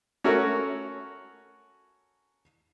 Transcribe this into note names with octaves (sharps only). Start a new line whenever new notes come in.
C#4 F#4 A4 A#4 C#5